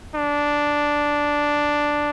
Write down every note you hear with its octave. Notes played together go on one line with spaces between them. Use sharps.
D4